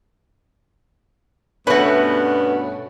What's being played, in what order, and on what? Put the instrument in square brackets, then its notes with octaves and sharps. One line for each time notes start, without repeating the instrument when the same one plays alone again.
[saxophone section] G2 B3 [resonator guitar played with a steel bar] B2 A3 [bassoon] C#4 [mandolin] F#4 B4